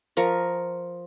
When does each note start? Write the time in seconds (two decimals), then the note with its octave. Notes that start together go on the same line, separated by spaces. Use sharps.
0.17 F3 A#4 C#6